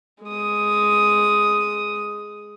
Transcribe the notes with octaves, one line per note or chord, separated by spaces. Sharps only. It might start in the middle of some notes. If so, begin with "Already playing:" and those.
G#3 D#6